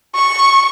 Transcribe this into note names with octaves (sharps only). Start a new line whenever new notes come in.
C#6